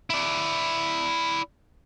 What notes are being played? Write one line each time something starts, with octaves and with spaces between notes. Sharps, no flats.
E4 D5